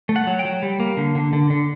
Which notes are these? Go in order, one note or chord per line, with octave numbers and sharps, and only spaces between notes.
A3
F#5
F#3
G5
F#3
G3
A#3
D3
D3
D3
D3